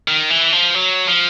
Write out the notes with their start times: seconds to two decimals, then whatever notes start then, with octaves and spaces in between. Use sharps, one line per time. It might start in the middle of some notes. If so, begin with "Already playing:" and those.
0.08 D#3
0.30 E3
0.53 F3
0.75 F#3
1.08 F3